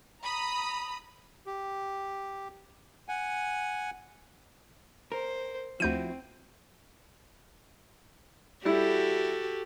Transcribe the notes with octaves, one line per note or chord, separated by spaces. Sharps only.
A#5 B5 D#6
G4
F#5 G#5
A#4 C5
D2 F3 C4 E4 F#4 G6 D#7
G3 E4 F#4 G4 A4